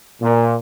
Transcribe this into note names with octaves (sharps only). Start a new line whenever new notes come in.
A#2